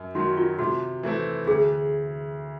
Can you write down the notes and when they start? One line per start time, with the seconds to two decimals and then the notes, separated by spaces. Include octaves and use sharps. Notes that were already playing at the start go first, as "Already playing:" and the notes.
Already playing: F#2
0.15 D#3 F#3 F#4
0.37 F4
0.59 C3 F#4
1.03 E3 A3 C4 E4
1.47 D2 G#4